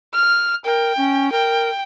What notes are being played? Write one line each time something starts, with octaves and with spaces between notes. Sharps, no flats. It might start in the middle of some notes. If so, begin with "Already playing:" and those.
F6
A#4 G5
C#4
A#4 G5